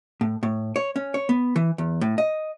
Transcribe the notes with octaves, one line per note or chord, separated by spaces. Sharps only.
A2
A2
C#5
C#4
C#5
B3
E3
E2
A2
D#5